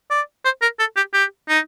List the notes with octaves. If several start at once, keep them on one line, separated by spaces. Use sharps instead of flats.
D5
C5
A#4
A4
G4
G4
D#4